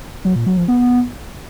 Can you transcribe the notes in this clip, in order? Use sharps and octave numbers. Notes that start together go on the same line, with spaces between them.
F#3
A#2
F#3
F3
B3